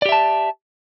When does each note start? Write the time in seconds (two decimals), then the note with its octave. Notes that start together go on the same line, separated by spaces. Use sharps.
0.02 D5
0.06 G4
0.09 E5
0.12 A5